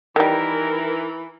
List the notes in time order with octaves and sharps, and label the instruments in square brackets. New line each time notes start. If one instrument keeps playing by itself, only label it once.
[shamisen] D#3 G3 [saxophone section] E3 [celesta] D#4 [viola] E4 A#4